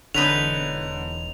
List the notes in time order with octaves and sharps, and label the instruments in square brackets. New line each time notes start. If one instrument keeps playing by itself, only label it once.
[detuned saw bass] E1 [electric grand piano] D3 [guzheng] D#4 B4 C#5 [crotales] F7